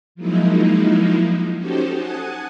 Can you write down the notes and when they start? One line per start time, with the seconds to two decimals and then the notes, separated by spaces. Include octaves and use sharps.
0.15 F3 F#3 G#3 A#3 D#4 E4
1.58 C#4 D#4 F#4 G4 A4 C5
1.94 F#5 G#5 A5 D#6